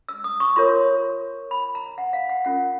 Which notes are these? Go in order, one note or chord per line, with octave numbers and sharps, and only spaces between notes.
E6
D#6
C#6
F4 A#4 C#5 C6
B5
A#5
F#5
F5
F#5
C#4 F4 A#4 F#5